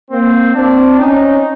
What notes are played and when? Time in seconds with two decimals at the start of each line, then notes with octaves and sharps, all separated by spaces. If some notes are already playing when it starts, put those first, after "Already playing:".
0.11 A#3 C4
0.55 C4 D4
0.99 C#4 D#4